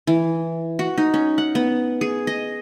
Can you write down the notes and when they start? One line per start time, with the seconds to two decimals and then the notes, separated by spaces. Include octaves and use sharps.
0.07 E3
0.79 F#4
0.98 D#4
1.14 C#4
1.38 F#5
1.55 B3
2.01 G#4
2.27 D#5